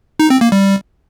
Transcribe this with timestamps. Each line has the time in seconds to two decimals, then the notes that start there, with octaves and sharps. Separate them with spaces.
0.20 D#4
0.30 C4
0.41 A#3
0.52 G3